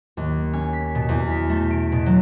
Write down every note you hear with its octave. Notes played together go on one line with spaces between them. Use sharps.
D#2
C#4
B6
B2
E2
B6
A3
D7
B2
F#3